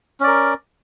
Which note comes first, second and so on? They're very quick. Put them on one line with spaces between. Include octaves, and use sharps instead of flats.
C#4 D5 A#4